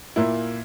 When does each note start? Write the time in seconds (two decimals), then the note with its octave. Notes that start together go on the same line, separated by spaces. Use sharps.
0.16 A#2 A#3 E4